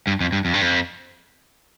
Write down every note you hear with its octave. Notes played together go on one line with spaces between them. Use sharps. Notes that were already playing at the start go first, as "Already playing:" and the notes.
G2
F2
G2
F2
G2
F2